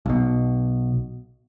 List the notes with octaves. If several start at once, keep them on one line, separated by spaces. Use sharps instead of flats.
B1 B2